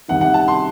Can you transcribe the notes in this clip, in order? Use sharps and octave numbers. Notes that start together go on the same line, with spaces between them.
C2 C3 D#3 F#5
F#5
A5
C6